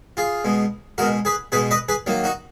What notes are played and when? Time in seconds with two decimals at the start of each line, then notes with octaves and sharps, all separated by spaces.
0.17 F4 G#4
0.44 B2 G#3
0.98 B2 G#3 F#4 A#4
1.25 G#4 B4
1.52 B2 G#4 B4
1.55 G#3
1.71 B4 D#5
1.89 G#4 B4
2.07 D#3 F#3 A#3
2.24 D#4 F#4